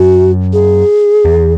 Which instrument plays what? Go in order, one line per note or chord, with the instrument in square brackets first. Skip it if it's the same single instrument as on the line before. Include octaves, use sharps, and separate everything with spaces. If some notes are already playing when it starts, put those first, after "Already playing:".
Already playing: [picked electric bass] F#2 [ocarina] F#4
[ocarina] G#4
[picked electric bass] E2